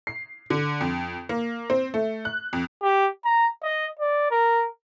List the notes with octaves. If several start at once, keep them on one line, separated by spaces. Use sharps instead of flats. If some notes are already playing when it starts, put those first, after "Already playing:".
C7
D3
F2
A#3
C4
A3
F#6
F2
G4
A#5
D#5
D5
A#4